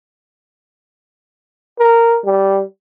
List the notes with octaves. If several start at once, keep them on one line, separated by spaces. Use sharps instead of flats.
A#4
G3